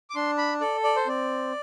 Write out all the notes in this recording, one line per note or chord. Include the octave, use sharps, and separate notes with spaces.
D6
D4 C6
B5
A4 D5
D5
C5
C4 D5